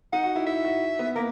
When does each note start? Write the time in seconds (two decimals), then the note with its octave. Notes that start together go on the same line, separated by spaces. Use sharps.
0.13 D#4 F#5
0.24 F#4
0.36 E4
0.47 E4 E5
0.65 F#4
0.99 B3
1.16 A#3 A#4